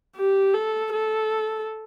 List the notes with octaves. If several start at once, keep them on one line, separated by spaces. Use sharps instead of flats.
G4
A4
A4